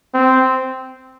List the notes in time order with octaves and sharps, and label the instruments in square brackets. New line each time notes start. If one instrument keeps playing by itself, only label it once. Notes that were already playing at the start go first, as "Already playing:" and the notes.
[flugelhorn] C4